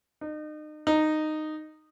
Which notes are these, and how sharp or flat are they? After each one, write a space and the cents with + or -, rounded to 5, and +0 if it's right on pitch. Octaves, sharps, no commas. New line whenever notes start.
D#4 -35
D#4 -10